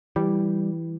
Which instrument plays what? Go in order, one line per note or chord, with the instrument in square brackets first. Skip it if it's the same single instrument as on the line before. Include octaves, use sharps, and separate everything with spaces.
[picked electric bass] E3 [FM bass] G3